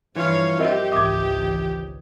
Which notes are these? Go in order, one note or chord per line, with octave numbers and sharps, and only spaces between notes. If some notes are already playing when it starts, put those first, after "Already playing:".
G2 E3 F3 F4 C#5 F5
C4 G4 A#4 D#5 E5
G#1 C#2 E3 E5 D6 D#6 G#6